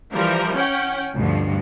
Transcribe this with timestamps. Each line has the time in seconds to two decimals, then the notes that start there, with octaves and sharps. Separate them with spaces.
0.13 E3 F3 G3 A#4
0.55 C#4 F#5 G5
1.15 D2 G2 B2 F3